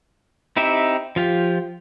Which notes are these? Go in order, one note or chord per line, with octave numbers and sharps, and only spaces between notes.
C4 D#4 E4 G4 E5
F3 F4 G4